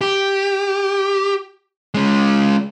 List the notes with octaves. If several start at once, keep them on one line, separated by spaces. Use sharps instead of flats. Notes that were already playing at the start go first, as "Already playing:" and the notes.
G4
G#3 C#4